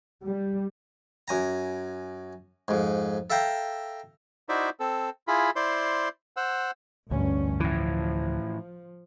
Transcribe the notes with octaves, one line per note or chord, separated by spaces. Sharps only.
G3
F#2 G#5 A#5
F2 G#2
A4 E5 F5 G5 A#5
D#4 E4 F#4 C5 D5 E5
C4 A4
E4 F4 G#4 B5
E4 C5 D5 C6
C5 F#5 E6
A1 D2 G2 C#4
A2 E3 F3